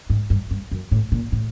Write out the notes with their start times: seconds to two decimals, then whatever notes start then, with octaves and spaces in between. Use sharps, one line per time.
0.10 G#2
0.30 G2
0.51 G2
0.72 F#2
0.92 A2
1.12 A#2
1.32 A2